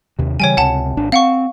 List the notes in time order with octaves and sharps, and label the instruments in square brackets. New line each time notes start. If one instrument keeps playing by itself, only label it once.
[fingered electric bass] D#2 C3
[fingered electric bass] C#3 E3 G3 [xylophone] C#5 G5 G#5
[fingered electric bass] C#2 C3 [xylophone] F#5 A5
[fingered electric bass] G#1 D4
[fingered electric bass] C4 [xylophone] F5 F#5 C#6